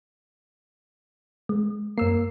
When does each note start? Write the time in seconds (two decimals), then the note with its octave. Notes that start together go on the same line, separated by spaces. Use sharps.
1.49 G#3
1.98 F#2 A#3 E6 C7